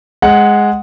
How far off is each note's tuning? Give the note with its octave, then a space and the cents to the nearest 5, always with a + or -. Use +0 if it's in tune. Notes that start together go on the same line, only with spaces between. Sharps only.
G#3 +0 F#5 +0